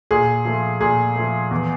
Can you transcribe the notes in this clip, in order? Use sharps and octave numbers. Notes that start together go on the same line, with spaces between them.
A#2 G#4
F3 A3
A#2 G#4
F3 A3
E2